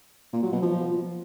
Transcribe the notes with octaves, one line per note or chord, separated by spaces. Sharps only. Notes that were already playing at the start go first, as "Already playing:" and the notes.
A#2
F#3
B2
F3